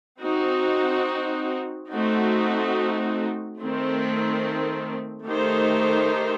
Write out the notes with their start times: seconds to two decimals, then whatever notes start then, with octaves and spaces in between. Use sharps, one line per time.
0.22 C4 D#4 F#4
1.91 A3 C4 D#4 F#4
3.59 D#3 A3 C4
5.27 D#3 A3 D#4 G4 C5